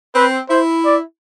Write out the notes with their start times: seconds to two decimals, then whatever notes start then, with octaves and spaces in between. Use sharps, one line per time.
0.15 C4 B4
0.50 E4 C5
0.85 D5